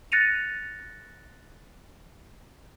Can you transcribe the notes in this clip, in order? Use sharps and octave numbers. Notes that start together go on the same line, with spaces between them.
F#6 A6 A#6 C#7 D#7 F7